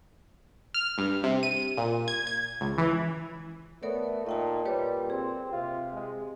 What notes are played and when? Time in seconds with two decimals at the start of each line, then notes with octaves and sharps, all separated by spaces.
0.74 F6
0.98 G2
1.24 C3
1.43 D#7
1.77 A#2
2.08 G#6
2.27 G#6
2.61 C#2
2.78 E3
3.83 A3 B3 A#4 C#5 D5
4.26 A#2 D#4 D#5 G5 A5
4.65 A#2 G3 G4 B4 C#5
5.10 C4 G#4
5.52 C3 F4
5.93 G#3